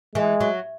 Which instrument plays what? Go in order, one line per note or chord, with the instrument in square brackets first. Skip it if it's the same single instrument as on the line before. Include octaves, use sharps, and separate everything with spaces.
[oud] E3 [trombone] G#3
[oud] F#3